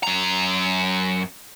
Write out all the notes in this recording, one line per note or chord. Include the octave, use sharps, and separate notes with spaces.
F#2 A#5